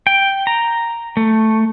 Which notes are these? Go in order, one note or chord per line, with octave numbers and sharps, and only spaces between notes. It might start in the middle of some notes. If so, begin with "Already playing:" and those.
G5
A#5
A3